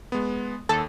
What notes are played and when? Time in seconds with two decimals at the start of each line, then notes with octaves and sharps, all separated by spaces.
0.12 G#3 B3
0.69 D#2 A4